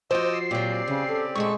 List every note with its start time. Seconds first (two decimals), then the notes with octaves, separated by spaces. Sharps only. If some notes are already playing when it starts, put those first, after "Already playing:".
0.11 F3 F#4 C5 D#5 D6 E6
0.34 C7
0.51 A#2 F#3 C4 G4 D5
0.88 C#3 C#4
1.08 A4
1.35 A#2 C#3 G#3 A4 C#6